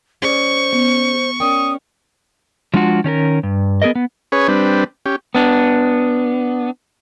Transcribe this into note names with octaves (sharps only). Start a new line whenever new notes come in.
C#4 G#4 C5 D5 C#6
B3
C#4 A#4 D5 G5 D#6
F3 G#3 D4 F4 F#4
D#3 C#4 G#4 A#4
G2
B3 G#4 A#4 D#5
B3
C#4 G#4 B4 C#5
G3 C4 D4 B4
C#4 G4
B3 D4